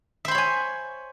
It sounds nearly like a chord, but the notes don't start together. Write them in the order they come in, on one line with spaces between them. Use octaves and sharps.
E5 C5 B5 C#5 G#5